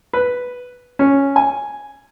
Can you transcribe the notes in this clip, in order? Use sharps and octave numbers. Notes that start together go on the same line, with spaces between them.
B4
C#4
G#5